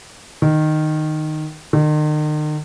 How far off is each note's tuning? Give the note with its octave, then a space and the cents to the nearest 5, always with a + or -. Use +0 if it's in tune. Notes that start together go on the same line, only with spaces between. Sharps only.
D#3 -10
D#3 -40